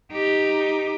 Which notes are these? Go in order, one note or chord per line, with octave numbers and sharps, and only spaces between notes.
D#4 G4